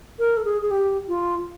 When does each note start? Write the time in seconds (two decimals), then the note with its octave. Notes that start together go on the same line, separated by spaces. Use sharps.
0.19 A#4
0.37 A4
0.45 G#4
0.62 G#4
0.71 G4
1.08 F4